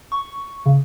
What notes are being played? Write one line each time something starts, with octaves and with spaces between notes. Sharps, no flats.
C#6
C#3